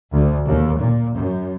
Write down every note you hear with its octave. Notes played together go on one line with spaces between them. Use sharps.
D2
D#2
A#2
F#2